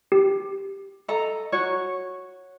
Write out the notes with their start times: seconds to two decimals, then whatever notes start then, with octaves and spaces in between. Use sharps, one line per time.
0.12 G4
1.08 A4 D#5 A#5
1.52 F#4 C#5